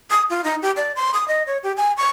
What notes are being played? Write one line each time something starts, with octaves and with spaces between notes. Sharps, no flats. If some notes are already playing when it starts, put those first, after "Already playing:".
D#6
F4
D#4
G4
D5
C6
D#6
D#5
C#5
G4
G#5
C#6